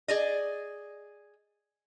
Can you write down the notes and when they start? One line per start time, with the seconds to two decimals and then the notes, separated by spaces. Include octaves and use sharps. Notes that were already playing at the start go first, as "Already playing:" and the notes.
0.08 G#4 D5 D#5